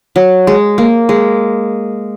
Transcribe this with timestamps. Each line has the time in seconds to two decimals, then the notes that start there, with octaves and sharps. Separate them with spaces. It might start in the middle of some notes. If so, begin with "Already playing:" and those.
0.16 F#3
0.47 G#3
0.78 A#3
1.09 G#3